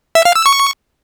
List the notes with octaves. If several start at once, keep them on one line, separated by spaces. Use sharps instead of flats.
E5
F5
E6
C#6